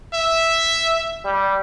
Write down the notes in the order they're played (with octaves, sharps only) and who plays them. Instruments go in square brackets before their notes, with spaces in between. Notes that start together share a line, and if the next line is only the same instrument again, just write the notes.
[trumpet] E5
[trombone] G3